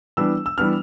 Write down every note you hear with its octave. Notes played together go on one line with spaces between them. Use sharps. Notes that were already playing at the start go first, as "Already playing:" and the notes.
E3 G3 B3 D4 E6
E6
E3 G3 B3 D4 F6